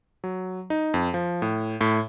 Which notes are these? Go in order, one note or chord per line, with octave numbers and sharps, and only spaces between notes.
F#3
D#4
F2
F3
A2
A2